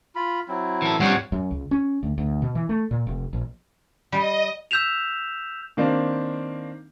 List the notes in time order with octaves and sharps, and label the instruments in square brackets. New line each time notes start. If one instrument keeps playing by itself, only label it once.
[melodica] F4 B5
F#3 C4 E4
[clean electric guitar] E3 A4
[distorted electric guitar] G2 [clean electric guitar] F3 G3 C4 [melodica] C#5 F#5
[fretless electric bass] F#2
C#2
C#4
D2
D2
B2
E3
A3
A#2
F1
A#1
[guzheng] G3 [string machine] D#5
[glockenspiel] E6 F6 G6 B6 E7 F7
[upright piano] D#3 A#3 C4 D4